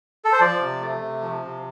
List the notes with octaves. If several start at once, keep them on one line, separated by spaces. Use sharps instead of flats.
A4
C5
F3 D5
C3
A3
C3
F3
C3